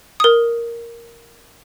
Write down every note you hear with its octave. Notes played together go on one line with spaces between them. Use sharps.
A#4 D#6